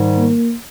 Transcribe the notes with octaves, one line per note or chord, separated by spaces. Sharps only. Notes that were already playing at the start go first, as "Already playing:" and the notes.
Already playing: G#2 D#3 G3
A#3